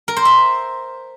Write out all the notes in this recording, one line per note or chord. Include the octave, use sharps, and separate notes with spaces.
A#4
C5
E5